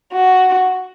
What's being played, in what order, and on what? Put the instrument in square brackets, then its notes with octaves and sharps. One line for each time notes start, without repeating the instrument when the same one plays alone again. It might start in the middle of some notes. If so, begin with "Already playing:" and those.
[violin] F#4